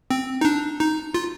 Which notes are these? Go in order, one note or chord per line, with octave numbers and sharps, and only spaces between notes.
C4
D#4
D4
D#4
F4